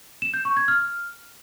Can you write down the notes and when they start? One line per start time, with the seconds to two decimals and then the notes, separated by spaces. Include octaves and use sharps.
0.22 E7
0.34 G6
0.45 C#6
0.57 G#6
0.68 F6